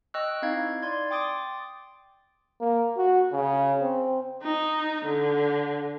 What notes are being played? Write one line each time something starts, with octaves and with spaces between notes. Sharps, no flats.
D#5 G5 C#6 E6 F#6
C4 D#4 E4 F5 G#6
D5 C6 G#6
G5 C6 D6 D#6 A6 D7
A#3
F#4
C#3
C4
D#4
D3